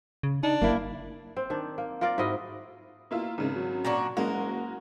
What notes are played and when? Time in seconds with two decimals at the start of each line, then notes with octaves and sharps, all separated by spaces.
0.23 C#3
0.43 D4 D#4
0.62 G1 A#3 E4
1.37 C4
1.50 D#3 D4
1.78 A#3
2.01 F4 A#4 D5 F5
2.18 G#2 E4 F#4 D#5
3.11 B2 A#3 E4 F4
3.38 G#1 G#2 C#3
3.56 F#3
3.85 A#2 D4 F#4
4.17 F#1 G#3 A#3 F#4 A#4